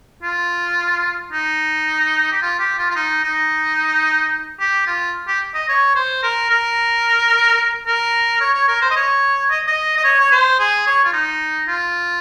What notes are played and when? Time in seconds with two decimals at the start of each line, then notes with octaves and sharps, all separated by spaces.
0.23 F4
1.32 D#4
2.32 G4
2.42 F4
2.59 G4
2.78 F4
2.90 F4
2.95 D#4
3.23 D#4
4.60 G4
4.86 F4
5.27 G4
5.54 D#5
5.68 C#5
5.95 C5
6.23 A#4
6.50 A#4
7.86 A#4
8.40 C#5
8.54 C#5
8.67 A#4
8.81 C5
8.91 D#5
8.96 C#5
9.50 D#5
9.67 D#5
9.97 D#5
10.04 C#5
10.20 C#5
10.31 C5
10.59 G#4
10.87 C#5
11.04 F4
11.13 D#4
11.68 F4